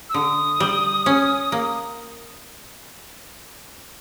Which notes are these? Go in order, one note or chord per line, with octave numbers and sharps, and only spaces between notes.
E6
D3 D#6
G3
C#4
A#3